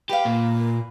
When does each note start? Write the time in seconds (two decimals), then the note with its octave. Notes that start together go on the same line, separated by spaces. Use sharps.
0.09 G4 B4 F5
0.25 A#2 A#3